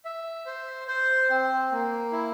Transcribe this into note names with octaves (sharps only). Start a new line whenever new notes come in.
E5
C5
C5
C4
A#3
E4